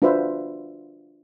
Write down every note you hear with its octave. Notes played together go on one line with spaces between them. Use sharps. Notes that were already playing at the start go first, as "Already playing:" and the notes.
D4 F4 F#4 B4 C5 E5